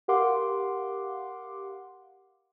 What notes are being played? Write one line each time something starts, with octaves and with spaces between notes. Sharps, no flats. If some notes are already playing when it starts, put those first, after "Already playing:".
G4 A#4 F5 F#5 C6 D6